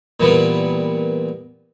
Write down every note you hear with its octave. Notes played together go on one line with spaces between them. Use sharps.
A#2 E3 G3 B3